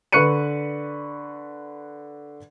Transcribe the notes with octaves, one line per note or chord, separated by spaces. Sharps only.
D3 B4 C#6 F#6 C#7 D#7